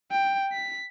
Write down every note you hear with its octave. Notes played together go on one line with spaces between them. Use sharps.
G5
B6